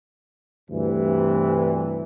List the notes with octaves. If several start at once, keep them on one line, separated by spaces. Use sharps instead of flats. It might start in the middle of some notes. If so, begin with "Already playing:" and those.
D2 G2 C3 E3